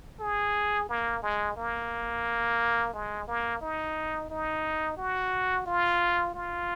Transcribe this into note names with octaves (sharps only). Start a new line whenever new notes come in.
G#4
A#3
G#3
A#3
G#3
A#3
D#4
D#4
F#4
F4
F4